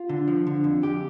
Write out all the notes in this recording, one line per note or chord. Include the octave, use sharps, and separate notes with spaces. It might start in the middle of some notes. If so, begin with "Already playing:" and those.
Already playing: F4
D3
F3
D3
F2
F2 G4